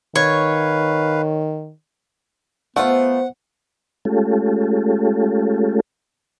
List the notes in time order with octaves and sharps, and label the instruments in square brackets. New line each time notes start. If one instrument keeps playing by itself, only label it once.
[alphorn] D#3 [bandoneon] B4 F5 [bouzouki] C#5
[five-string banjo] A3 F4 [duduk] B3 [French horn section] C5 [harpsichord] F#5
[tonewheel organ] G#3 A3 C#4 F4 G4 A4